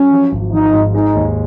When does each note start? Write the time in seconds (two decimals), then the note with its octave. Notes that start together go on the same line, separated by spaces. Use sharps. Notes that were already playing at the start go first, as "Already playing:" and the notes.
Already playing: F#3 C#4
0.11 F3
0.32 G#1
0.52 F3 D#4
0.73 G#2
0.94 G#3 D#4
1.15 D#2